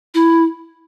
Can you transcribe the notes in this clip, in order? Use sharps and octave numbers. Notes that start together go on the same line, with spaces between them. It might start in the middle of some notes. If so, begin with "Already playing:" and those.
E4